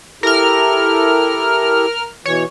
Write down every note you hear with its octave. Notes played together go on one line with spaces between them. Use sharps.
E4 G4 A4 A#4 F6
B2 E3 C#5